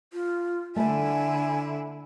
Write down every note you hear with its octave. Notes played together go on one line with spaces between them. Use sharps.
F4
D3 A3 E4 D5 G#5